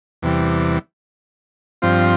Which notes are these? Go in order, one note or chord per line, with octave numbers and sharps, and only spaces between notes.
E2 C3 E3 G3
G2 F3 C4 F4